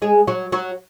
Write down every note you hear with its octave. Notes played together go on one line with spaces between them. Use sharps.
G#3 G#4
F#3 F#4
F#3 F#4